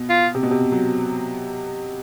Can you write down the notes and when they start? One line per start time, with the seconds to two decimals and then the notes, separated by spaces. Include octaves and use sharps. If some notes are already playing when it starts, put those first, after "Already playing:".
Already playing: B2
0.10 F4
0.35 C3
0.43 B2
0.51 C3
0.72 F#3